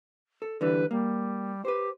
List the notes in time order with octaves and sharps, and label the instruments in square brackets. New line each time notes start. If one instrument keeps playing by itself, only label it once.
[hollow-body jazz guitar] A4
[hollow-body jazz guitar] D3 E3 G3 [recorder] B4
[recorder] G3 [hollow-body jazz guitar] A#3
[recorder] G4 [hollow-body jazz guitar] B4 C5